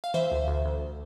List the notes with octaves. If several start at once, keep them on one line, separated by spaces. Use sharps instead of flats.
F5
E3 C5 E5
D2
D2
D2